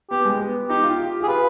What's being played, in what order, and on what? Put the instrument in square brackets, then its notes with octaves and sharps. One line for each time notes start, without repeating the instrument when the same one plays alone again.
[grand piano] B3 [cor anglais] G4
[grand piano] G#3
B3
[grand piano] D#4 [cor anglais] G4
[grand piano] F4
G4
G4
[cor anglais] G#4
[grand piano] F4 [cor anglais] B4